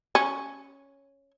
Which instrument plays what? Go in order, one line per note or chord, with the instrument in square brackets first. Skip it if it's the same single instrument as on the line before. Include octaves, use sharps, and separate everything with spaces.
[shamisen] C#4